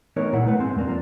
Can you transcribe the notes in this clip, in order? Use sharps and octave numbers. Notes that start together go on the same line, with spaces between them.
E3 A3 B3 D#4 A#4 C#5
C2 A#2 G#3 A#3 E4 F#5
A3 B4 F#5
G#2 G#3 C4
E2 A#2 A#3 D4
F3 A#3 C#4 D4